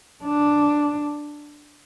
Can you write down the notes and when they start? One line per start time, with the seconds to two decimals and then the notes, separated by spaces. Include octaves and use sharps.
0.24 D4